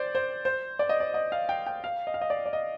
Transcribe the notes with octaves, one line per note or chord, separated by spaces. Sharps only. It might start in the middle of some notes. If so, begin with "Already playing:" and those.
Already playing: C5 D5
C5
C5
D5
D#5
D5
D#5
F5
G5
G5
F5
D#5
F5
D#5
D5
D5
D#5